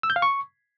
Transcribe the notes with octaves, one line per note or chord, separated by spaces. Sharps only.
E6
G6
F5
C#6